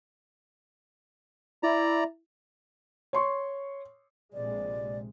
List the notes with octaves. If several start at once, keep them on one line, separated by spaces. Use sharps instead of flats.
E4 D5 A#5
C#5 C6 C#6
A#1 C3 G#3 D5